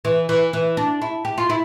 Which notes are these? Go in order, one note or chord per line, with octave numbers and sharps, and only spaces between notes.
E3
E3
E3
D4
E4
G4
F4
E4